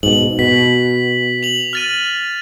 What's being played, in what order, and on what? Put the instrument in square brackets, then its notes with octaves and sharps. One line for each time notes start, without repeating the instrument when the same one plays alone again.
[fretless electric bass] G#2 B2 [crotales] F#7
[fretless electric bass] B2 [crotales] B6
[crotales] F7 F#7
F6 A6 D#7